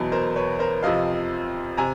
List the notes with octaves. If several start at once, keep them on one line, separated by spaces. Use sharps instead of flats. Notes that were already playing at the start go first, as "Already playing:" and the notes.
Already playing: E2 B2 F#3
A#4 C5
B4 C#5
A#4 C5
F2 C3 F3 D#5 F5
C3 G#5 A#5